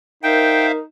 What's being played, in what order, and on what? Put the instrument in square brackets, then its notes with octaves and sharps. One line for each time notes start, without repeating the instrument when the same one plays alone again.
[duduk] D#4 [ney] A#4 [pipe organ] C5 E5 F5 [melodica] G5